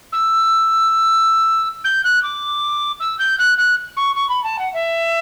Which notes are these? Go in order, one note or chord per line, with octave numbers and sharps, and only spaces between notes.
E6
G6
F#6
D6
E6
G6
F#6
F#6
C#6
C#6
B5
A5
F#5
E5